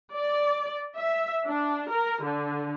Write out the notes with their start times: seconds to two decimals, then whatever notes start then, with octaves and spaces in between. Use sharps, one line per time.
0.14 D5
0.96 E5
1.47 D4
1.91 A#4
2.23 D3